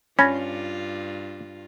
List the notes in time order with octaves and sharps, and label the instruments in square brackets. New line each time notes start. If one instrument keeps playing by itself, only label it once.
[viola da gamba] G2 F4 [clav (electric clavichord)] C#4 [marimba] B5 G#6 A#6